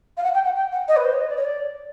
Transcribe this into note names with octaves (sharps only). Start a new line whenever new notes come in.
F5
F#5
G5
F#5
G5
F#5
D#5
B4
C5
C#5
D#5
D5
C#5
D5